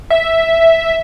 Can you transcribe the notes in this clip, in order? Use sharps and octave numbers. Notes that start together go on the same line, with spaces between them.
E5